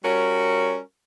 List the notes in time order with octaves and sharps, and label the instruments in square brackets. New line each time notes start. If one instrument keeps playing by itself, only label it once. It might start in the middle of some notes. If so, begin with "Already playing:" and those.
[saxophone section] G3 C#4 F#4 A#4 C#5